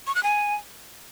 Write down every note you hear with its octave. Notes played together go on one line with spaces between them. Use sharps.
C#6
F#6
G#5